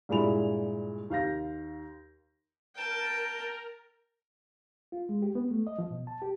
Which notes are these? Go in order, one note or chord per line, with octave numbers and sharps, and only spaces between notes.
G2 A#2 G#3 E4 B5 F7
D#2 F5 G6 A#6
A#4 G5 A5
F4
G#3
G4
B3
A3
D#5
F3
B2
A5
G4